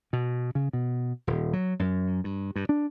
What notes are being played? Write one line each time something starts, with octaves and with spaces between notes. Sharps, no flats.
B2
C#3
B2
D#1
F#3
F#2
G2
G2
D4